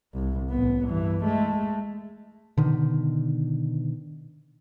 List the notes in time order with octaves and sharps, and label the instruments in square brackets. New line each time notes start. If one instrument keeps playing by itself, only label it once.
[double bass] C2
A1 B3
G2 E3
G#3 A3
[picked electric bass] B2 D3 D#3